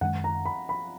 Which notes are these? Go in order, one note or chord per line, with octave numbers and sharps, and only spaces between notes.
F#2 D#3 G#3 C#4 F#5
A#5
B5
B5